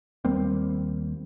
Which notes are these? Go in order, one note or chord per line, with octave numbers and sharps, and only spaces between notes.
D#2 G3 A#3 C4